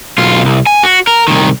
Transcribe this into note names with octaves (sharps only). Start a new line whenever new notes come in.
B1 F4
C2
G#5
F#4
A#4
C2 D#3